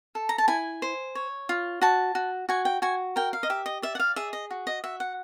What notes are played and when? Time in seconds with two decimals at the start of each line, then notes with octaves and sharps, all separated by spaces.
0.15 A4
0.29 A#5
0.38 A5
0.48 E4 G#5
0.82 C5
1.15 C#5
1.49 F4
1.81 F#4 A5
2.15 F#4
2.49 F#4 G#5
2.65 G5
2.82 F#4 G#5
3.16 A#4 G5
3.33 F5
3.43 D#5
3.50 G4 E5
3.66 D#5
3.82 D5 E5
3.95 F#5
3.99 F5
4.16 G#4 E5
4.33 D#5
4.51 F#4
4.67 D#5
4.84 F#4 E5
5.00 F#5